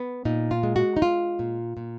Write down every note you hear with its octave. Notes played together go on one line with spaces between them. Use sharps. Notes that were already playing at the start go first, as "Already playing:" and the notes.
Already playing: B3
A#2 D#4
F4
G#3
F#4
D#4
G#3 F4
A#2
A#2